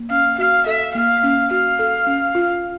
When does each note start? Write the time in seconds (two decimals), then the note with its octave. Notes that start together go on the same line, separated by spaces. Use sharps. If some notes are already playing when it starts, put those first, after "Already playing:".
Already playing: A#3
0.10 C#4 F5
0.38 F#4 F5
0.66 A4 E5
0.95 A#3 F5
1.23 C#4
1.51 F#4 F5
1.79 A4
2.07 C#4
2.35 F4